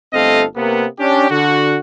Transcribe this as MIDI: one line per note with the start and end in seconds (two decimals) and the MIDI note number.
0.14 0.44 31
0.14 0.44 57
0.14 0.44 60
0.14 0.44 69
0.14 0.44 75
0.14 0.44 77
0.56 0.86 48
0.56 0.86 58
0.56 0.86 59
1.00 1.27 61
1.00 1.27 62
1.00 1.27 67
1.30 1.78 50
1.30 1.78 66